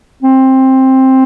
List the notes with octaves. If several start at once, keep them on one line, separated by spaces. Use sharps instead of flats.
C4